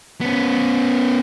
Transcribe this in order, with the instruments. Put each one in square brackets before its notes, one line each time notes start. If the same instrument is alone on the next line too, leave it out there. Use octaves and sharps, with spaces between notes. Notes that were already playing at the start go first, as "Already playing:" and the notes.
[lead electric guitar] B3 C#4